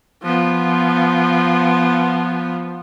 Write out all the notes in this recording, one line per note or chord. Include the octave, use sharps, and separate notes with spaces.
F3 B3